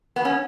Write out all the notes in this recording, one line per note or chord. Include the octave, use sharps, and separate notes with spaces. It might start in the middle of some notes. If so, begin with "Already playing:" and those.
B3
C#4